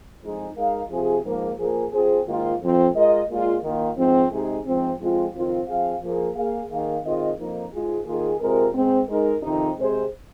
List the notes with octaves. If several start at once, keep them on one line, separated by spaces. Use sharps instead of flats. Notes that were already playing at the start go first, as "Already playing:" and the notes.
F2 F3 G#3 D#4 G#4
G#3 D#4 A#4 F5
C3 F3 C4 F4 G#4
G#2 F3 A#3
F3 A#3 G#4
F3 C4 G#4
G#2 D#3 A#3 F4
F2 F3 C4
G#3 F4 A#4 D#5
A#2 G#3 F4
D#3 A#3 F4
G#2 F3 C4
C3 G#3 D#4 G#4
G#2 F3 C4
F2 F3 G#3 C4 F4
F2 D#3 C4 F4
F3 C4 G#4 F5
F3 A#3 G#4
A#3 G#4 F5
D#3 A#3 G#4 F5
D#3 C4 F4 G#4 D#5
F2 F3 A#3 D#4
G#2 G#3 F4 G#4
D#3 A#3 F4 G#4
C3 G#3 C4 F4 A#4
G#2 G#3 C4
G#3 D#4 A#4
F2 C3 D#3 C4 D#4
C3 G#3 C4 G#4 C5